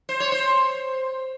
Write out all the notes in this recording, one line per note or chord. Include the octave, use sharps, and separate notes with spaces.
C5
C#5
C5